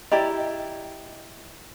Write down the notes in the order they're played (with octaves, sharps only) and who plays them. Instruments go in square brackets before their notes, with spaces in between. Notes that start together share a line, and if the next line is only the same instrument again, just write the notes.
[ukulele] E4 G4 D5 [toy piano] D#5 A#5 B5